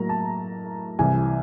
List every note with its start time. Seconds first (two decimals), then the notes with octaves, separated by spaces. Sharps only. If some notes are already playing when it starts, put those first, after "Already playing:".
Already playing: A2 F#3 A#3 A#5
0.09 A5
0.99 C2 C3 E3 G#5